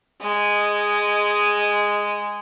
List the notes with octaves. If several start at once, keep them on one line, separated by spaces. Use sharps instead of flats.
G#3 D#5